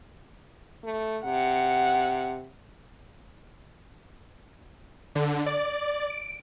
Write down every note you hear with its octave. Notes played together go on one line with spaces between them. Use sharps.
A3
C3 F#5
D3
D5
D7